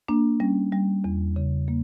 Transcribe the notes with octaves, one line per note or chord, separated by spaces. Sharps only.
A#3 D4
G3 C#4
G3
E2
C#3
A#3